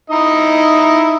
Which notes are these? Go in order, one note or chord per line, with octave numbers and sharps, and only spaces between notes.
D#4 E4 D#5